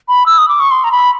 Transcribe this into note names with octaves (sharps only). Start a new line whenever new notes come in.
B5
E6
D#6
D6
C#6
C6
A#5
B5